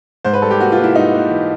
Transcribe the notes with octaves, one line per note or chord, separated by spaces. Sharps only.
G#2 C5
B4
G3 A4
G4
A#3 F#4
F4
A#3
E4
G#2 D#4
A#3
E3